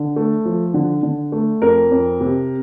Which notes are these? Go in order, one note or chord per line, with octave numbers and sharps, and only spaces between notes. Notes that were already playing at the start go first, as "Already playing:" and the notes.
Already playing: D3
A3
F3
D3
D3
A3
F2 A#4
F2
C3